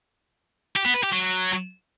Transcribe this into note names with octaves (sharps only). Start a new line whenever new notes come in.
G4
B3
B4
G4
F#3